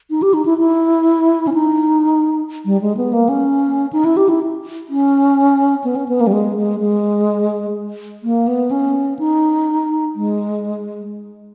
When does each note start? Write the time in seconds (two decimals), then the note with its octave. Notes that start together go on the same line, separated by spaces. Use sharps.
0.10 D#4
0.22 G4
0.34 D#4
0.45 E4
0.58 E4
1.47 C#4
1.54 D#4
2.66 G3
2.81 G#3
2.97 B3
3.13 A#3
3.29 C#4
3.93 D#4
4.05 E4
4.17 G4
4.29 E4
4.89 C#4
5.84 B3
5.96 C#4
6.08 B3
6.21 A#3
6.27 G3
6.33 G#3
6.57 G#3
6.80 G#3
8.23 A#3
8.48 B3
8.71 C#4
9.19 D#4
10.16 G#3